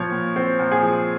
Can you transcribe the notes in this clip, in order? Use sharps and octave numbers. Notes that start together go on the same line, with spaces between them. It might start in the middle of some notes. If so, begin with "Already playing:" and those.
Already playing: A#2 F3 C#5
A#2
C4
A#2
G#4
F3